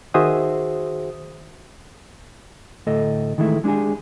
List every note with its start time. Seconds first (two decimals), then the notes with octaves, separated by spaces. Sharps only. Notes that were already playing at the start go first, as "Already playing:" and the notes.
0.14 D#3 F#4 G#4 C5 E5 D#6
2.87 D2 A2 A4 D#5
3.38 D#3 E3 G#3 A3 E4
3.64 G#3 D4 D#4 G4 G#4